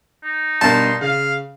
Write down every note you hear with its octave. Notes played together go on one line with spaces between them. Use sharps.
D#4
G2 B2 A#4 A5 C6
C#3 F5